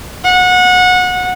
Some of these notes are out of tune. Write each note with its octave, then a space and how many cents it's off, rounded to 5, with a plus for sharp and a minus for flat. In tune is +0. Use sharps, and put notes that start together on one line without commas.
F#5 -25